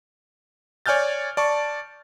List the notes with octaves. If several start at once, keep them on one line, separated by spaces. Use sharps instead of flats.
C#5 D5 G#5 F6 G6 A6
D5 A5 C#6